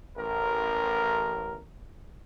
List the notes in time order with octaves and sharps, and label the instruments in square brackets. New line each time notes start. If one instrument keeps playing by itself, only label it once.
[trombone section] A1 A#4